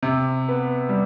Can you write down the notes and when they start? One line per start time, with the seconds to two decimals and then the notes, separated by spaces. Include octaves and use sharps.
0.03 C3
0.49 B3
0.89 G3